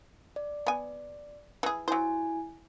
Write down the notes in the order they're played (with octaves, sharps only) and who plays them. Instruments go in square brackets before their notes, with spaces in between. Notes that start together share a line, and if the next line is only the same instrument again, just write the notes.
[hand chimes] D5
[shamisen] B3 G#5
E3 G#4
[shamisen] F#3 C5 [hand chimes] E4 G#5